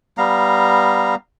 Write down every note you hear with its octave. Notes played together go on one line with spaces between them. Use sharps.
G3 B3 F5 A#5